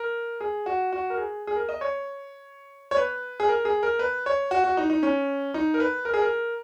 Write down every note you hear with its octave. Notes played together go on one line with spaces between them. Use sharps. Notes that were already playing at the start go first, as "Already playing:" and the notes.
Already playing: A#4
G#4
F#4
F#4
A#4
G#4
G#4
A#4
D#5
C#5
C#5
B4
G#4
A#4
G#4
A#4
B4
C#5
F#4
F#4
D#4
D#4
C#4
D#4
A#4
B4
A#4
G#4
A#4